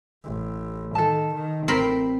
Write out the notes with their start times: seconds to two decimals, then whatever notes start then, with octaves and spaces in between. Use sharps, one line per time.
0.24 A1
0.95 D#3 A4 A5
1.35 D#3
1.68 A1 C4 A#4 B5